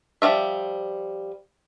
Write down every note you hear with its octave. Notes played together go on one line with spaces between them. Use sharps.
F3 G3 F4 E5